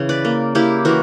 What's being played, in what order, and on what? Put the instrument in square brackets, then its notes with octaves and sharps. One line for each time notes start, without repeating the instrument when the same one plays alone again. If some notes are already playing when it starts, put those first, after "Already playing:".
Already playing: [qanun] C#3 E3 E4
B4 D5
A#3
A#3 E4 G4
E3 F#4 A#4